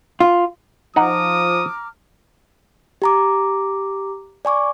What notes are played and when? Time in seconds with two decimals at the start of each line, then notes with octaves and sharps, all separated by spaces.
0.20 F4
0.96 F3 D#4 F#5 A#5 D6 D#6 F6
3.02 G4 A#5 D6
4.45 D5 G#5 C#6 D6